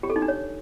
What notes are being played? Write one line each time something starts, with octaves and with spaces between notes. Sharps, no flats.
G4
A4
D#4
D4
C#5